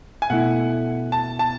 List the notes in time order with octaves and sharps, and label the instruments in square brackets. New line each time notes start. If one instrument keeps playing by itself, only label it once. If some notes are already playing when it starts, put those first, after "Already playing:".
[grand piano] G#5
[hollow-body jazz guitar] B2 A3 E4 [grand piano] F#5
[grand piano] A5
A5